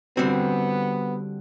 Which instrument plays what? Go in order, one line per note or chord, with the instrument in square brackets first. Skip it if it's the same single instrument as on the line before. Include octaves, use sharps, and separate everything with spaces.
[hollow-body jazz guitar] D3 G3 C4 F#4 [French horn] B3